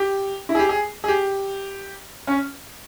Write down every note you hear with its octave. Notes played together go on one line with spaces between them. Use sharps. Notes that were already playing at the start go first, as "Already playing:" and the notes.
Already playing: G4
E4
G#4
G4
G#4
G#4
G4
C#4